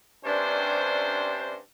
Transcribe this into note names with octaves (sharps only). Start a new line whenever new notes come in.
G2 C3 C#4 D4 C5